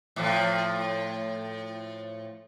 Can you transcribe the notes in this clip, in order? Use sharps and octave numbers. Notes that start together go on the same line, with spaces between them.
A2 F3